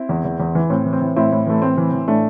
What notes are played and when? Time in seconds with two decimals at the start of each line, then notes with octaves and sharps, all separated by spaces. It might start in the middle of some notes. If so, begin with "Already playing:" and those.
Already playing: C4 E4
0.09 E2
0.25 E2
0.40 E2
0.55 E3
0.70 A2 C4
0.86 E3
0.93 C4
1.01 E3
1.16 A2 C4 E4
1.32 A2
1.47 E3 A3
1.62 A2 C4
1.77 E3
1.93 E3
2.08 A2 A3 D4